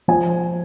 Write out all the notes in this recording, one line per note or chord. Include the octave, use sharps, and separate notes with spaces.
F3 G#5